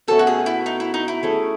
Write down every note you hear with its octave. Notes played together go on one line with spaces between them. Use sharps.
B2 A3 C#4 A4
F#4
G#4
E4
D#4
E4
D#4
E4
A3 C#4 G#4